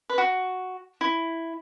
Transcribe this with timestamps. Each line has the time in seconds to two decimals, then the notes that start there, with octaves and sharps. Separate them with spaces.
0.10 B4
0.18 F#4
1.01 E4